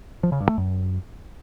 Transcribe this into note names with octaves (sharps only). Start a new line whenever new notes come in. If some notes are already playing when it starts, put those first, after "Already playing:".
F3
C#3
G2
A3
F#2